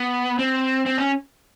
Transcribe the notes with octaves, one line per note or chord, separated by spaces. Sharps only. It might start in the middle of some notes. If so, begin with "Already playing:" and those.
Already playing: B3
C4
C4
C#4